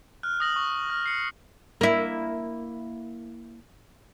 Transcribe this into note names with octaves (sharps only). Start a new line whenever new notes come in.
F6 F#6
D#6 A#6 F#7
C#6
F6
C7 C#7
A#3 E4